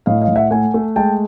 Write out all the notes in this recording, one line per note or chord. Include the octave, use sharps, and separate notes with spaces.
A2 D#5 F5
D#5 F5
A2
E5 F#5
A3 F#5 G#5
A3
G#3 G5 A5